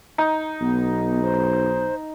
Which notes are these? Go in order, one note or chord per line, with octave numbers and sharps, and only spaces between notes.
D#4
B1 B3
C5